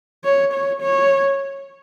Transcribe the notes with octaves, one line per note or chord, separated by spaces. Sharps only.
C#5
C#5
C#5